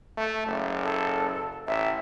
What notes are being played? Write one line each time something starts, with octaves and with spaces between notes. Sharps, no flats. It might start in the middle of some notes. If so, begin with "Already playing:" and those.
A3
F#1
A4
A1 E5